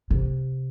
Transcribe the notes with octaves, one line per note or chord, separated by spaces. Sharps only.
C3